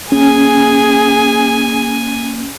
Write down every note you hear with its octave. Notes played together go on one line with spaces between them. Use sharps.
A#3 C#4 G#4 G#5